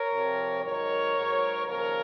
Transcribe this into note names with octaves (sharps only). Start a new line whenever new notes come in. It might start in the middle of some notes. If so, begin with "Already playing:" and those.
Already playing: A#4 C#5
F2 C3 F3
G#2 D#3 F#3 A#4 C#5
G#2 F#3
D#2 C#3 F3 A#4 C#5